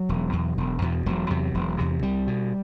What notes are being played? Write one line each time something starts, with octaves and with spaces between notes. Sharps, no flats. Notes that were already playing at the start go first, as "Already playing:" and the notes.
Already playing: F#3
E1
E2 B2
E1
E2 B2
E1 F#3
E2 C3
E1
E2 C3
C2 G3
B2